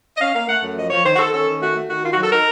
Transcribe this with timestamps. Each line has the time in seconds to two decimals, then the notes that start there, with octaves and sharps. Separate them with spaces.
0.17 D#5
0.20 C#4 F5
0.35 A#3 F5
0.48 A3 F#5
0.63 F#2
0.76 F3 D#5
0.90 F3 C#5
1.05 D#3 C5
1.14 F#4
1.19 D#3 A4
1.33 C#4 A4
1.47 D#3
1.61 A3 F#4
1.75 A3
1.90 D#3 F#4
2.04 D#3 F4
2.13 F#4
2.17 F#3
2.23 A4
2.32 D#4 A#4